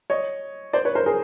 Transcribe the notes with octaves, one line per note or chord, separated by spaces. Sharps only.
C#5 D#5
C5 D5
B4 C#5
A#4 C5
G#4 A#4